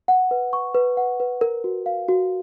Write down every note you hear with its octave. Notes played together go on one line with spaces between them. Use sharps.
F#5
B4
C#6
B4
F#5
B4
A#4
F#4
F5
F#4